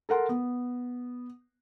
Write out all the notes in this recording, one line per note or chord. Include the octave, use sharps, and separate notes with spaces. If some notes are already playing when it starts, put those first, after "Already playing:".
A4 A#4 F#5 C6
B3